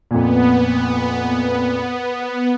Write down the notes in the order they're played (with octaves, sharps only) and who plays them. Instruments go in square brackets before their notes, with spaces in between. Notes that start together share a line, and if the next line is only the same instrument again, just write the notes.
[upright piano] F2 A#2 [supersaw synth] B3